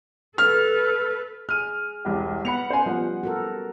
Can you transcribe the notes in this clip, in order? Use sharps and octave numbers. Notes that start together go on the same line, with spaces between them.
A4 B4 F6
G#4 F6 D#7
E1 C2 G4
B3 F#5 B5 C#7 F7
C#4 C5 G#5
F3 G3 B3 C5 F#5
F#4 A4 A#4